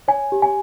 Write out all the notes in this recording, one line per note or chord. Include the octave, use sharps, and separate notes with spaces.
C#5 G#5
G4
G#5